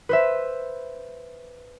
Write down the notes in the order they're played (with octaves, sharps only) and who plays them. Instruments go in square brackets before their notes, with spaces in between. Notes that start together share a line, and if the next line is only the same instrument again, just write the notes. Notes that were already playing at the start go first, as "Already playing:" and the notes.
[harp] B4 C5 E5